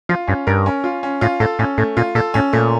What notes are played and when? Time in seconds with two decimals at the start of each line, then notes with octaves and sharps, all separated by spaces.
0.09 F3 F4
0.28 G2 C#4
0.47 G2 A#4
0.66 C#4
0.84 F4
1.03 C#4
1.21 A2 F4
1.40 A2 A4
1.59 A2 C#4
1.78 A2 A3
1.97 A#2 F4
2.15 A#2 A4
2.34 A2 C#4
2.53 A#2 A3